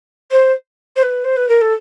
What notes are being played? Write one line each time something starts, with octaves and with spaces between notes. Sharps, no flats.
C5
C5
B4
C5
B4
A#4
A4